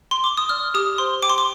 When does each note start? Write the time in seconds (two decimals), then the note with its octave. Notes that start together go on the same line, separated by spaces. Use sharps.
0.11 C6
0.24 D6
0.37 D#6
0.49 D5 F6
0.74 G4 D#6
0.98 C5 C6
1.23 G5 D6
1.30 C6
1.38 D6